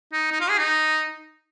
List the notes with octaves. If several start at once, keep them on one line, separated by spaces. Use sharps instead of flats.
D#4
D#4
F4
G#4
D#4